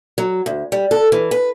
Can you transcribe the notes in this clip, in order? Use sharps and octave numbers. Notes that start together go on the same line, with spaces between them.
F#3
D2
G3
A4
E3
B4